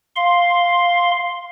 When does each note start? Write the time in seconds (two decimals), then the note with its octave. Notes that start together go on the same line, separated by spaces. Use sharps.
0.16 F5 C6